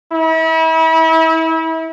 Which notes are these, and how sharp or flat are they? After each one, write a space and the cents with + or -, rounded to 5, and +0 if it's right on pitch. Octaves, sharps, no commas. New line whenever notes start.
E4 -35